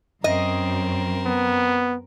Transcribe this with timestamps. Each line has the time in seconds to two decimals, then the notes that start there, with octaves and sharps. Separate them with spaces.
0.24 F#2 C4 A#4 D#5
1.26 B3